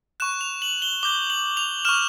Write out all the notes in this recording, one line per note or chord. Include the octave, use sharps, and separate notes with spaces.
C#6 F#6 E7
F7
F#7
G7
D6 G6 G7
F#7
F7
C#6 F6 E7